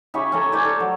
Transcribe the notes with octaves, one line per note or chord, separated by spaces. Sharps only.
C#3 G4 E5 C#6
C#4 A4 A#5
C5 D5 G#5
A4 C#5
F#3